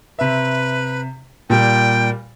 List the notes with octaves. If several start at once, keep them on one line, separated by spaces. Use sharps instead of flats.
C3 B4 E5
A#2 G3 G5